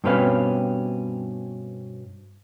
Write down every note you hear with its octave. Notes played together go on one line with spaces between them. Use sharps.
G2 B2 C4 C#4 B4 F5